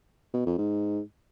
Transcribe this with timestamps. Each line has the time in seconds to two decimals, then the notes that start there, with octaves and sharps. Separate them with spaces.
0.34 B2
0.46 F2
0.58 G#2